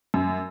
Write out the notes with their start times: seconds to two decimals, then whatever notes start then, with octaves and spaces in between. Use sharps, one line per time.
0.14 F#2